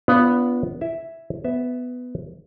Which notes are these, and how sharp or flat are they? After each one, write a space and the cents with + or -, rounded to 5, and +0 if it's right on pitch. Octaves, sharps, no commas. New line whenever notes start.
B3 +0 D4 -25 F4 -15
E4 +15 E5 +0
B3 +10 E5 +0